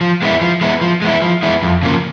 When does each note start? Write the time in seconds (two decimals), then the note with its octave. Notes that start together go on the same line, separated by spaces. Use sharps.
0.01 F3
0.22 G#3 B3 E4
0.41 F3
0.61 G#3 B3 E4
0.81 F3
1.02 G#3 B3 E4
1.22 F3
1.43 G#3 B3 E4
1.63 F2
1.83 C#3 F3 A#3